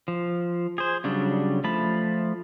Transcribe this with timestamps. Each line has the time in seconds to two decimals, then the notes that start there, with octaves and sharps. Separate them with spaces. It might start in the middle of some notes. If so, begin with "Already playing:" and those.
0.08 F3
0.78 G#4 C5
1.04 C#3 F#3 G3 D4
1.64 F3 A3 A5 B5